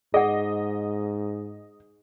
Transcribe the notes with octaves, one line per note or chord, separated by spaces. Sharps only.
G#2 G#4 D#5 F#5